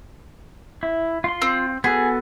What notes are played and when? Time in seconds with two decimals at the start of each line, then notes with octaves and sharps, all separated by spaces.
0.83 E4
1.24 F4 C6
1.42 C4
1.84 B3 F#4 G#4 A4